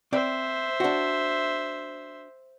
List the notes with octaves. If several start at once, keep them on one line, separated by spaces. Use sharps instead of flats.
C4 C5 D5 E5
D4 F#4